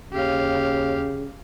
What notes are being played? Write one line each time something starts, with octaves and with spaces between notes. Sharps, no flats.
D#2 C#3 G4 F5